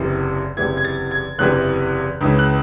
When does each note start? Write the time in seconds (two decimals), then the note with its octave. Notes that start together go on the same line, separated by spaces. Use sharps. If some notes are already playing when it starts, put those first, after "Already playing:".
Already playing: F#1 E2 C3 E3
0.57 F#1 E2 C3 E3 G#6
0.77 G#6
0.85 A6
1.11 G#6
1.38 F#1 E2 C3 E3 F#6
2.21 C#2 C#3 E3
2.39 F#6